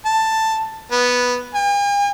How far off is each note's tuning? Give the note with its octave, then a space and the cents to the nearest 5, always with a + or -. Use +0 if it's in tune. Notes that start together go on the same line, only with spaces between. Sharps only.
A5 +10
B3 -5
G#5 -45